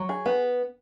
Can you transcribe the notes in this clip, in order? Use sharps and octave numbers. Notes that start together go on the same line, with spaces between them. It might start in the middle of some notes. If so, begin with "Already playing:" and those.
Already playing: F#3
G#4
B3